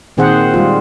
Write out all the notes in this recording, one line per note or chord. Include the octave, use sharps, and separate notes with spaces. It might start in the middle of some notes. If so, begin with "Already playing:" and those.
A#2 D#3 C4 G#4 C5 F#5
G3 G#3 F4